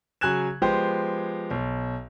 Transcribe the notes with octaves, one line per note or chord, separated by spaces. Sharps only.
C#3 F#3 G#5 F#6 G#6 E7
F3 G#3 B3 G4 C5
B1